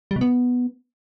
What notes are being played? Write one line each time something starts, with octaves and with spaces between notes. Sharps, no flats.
G3
B2
B3